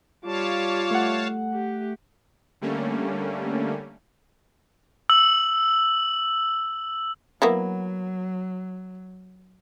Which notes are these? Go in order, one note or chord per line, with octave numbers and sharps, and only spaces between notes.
G3 F4 C#5 F5 A5 D6
A3 F#5
G4
D3 G3 A3 A#3 C#4
E6 F#7
F#3 A#3 B3 E4